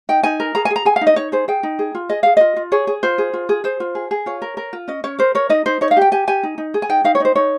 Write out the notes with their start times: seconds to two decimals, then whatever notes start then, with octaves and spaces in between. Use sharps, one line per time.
0.09 D#4 G5
0.23 D#4 G#5
0.40 A#4
0.55 G#4 A#5
0.65 G#5
0.70 G#4
0.76 A#5
0.85 G#4 G#5
0.96 F5
1.01 D#4
1.07 D#5
1.16 D#4 C#5
1.32 G#4 C5
1.48 G#4 G5
1.63 D#4
1.79 G#4
1.95 F4
2.09 G#4 D#5
2.23 G#4 F5
2.37 F4 D#5
2.56 F4
2.72 G#4 C#5
2.87 G#4
3.03 F4 C5
3.18 G#4
3.33 F4
3.49 G#4
3.64 G#4 C5
3.80 F4
3.95 G#4
4.11 G#4
4.26 F4 C#5
4.42 A#4
4.57 A#4
4.73 F4
4.88 C#4 D#5
5.04 C#4 C#5
5.19 A#4 C5
5.35 A#4 C#5
5.49 D#4 D#5
5.66 D#4 C5
5.81 D#4 C#5
5.91 F5
5.97 G4 G5
6.12 G4 G#5
6.27 G4 G#5
6.43 D#4
6.58 D#4
6.74 G#4
6.82 G#5
6.89 D#4 G5
7.04 D#4 F5
7.15 C#5
7.20 D#4 C5
7.35 D#4 C#5